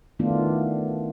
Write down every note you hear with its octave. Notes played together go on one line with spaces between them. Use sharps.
D#3 E3 A3 B3 D4 F4